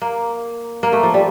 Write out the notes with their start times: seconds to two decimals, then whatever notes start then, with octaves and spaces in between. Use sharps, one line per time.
0.02 A#3
0.83 A#3
0.93 A3
1.03 F3
1.14 G3